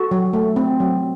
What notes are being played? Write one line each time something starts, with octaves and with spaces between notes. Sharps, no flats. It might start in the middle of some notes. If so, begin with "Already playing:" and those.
Already playing: F#4 A4
F#3
A3
C4
F#3